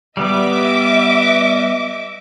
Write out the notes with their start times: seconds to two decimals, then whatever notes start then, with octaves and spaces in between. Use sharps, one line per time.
0.17 G3 B3 D#5 E5 D6